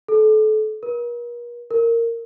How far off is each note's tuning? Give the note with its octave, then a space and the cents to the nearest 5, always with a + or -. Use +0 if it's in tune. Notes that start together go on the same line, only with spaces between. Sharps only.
A4 -30
A#4 +45
A#4 -10